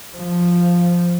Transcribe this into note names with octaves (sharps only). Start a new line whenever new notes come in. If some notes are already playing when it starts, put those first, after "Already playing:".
F3